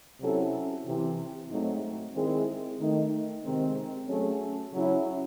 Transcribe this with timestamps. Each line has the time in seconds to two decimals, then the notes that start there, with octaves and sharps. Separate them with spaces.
0.20 C3 F#3 C#4 E4 A4
0.84 C3 E3 C4
1.49 G#2 F#3 A3 C4 D#4
2.14 D#3 G#3 C4 E4 G#4
2.79 D#3 A3 D#4
3.44 C3 D#3 G#3 C4
4.07 F#3 A3 C#4 G#4
4.72 C#3 F#3 C#4 E4